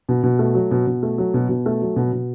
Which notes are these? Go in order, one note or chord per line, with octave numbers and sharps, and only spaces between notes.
B2
B2
A3
F#3
B2
B2
A3
F#3
B2
B2
A3
F#3
B2
B2